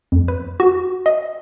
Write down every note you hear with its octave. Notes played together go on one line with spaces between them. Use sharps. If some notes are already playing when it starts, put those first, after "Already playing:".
F2
B4
F#4
D#5